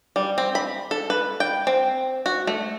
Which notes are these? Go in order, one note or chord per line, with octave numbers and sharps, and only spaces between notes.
G3
C4
B5
A4
B4
G5
C4
F#4
A3